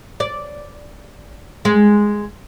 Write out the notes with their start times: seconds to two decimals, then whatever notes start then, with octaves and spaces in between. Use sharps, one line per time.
0.20 D5
1.65 G#3